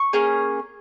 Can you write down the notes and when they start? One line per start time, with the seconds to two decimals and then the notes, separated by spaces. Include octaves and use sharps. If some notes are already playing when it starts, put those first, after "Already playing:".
Already playing: C#6
0.13 A#3 C#4 G#4